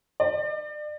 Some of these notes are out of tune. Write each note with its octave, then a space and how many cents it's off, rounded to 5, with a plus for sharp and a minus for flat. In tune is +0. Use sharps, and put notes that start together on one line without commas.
D5 +35